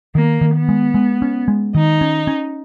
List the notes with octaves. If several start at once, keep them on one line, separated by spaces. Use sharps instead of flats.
D#3 A#3
D#3
B3
G#3
G#3
C#4
G#3
D#3 D#4
C#4
C#4